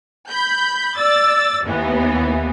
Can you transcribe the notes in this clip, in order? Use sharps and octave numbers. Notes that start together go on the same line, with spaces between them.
B5 G6
D5 E6 A6
D#2 E3 B3